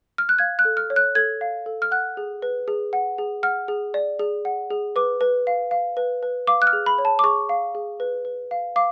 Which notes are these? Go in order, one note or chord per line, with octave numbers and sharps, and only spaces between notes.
F6
F#6
F5 G#6
F#6
A4
F6
C#5
F#6
A4 G#6
F5
A4
F6
F#5 F#6
G#4
B4
G#4
F#5
G#4
F#5 F6
G#4
D5
G#4
F#5
G#4
B4 D6
B4
F5
F5
B4
B4
F5 D6
F#6
F6
G#4
B5
C#5
A5
D6
G#4 C#6
F5
G#4
B4
B4
F5
F5 D6